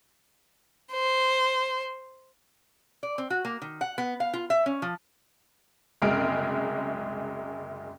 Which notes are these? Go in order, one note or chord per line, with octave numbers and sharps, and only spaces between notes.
C5
D5
C4
F#4
A#3
D#3
F#5
B3
F5
F4
E5
C#4
F3
F#1 C2 F#2 G#3 F6 D7